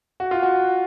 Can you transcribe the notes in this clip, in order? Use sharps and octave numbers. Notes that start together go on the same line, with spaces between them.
F#4
F4
F#4